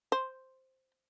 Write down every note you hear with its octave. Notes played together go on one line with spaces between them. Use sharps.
C5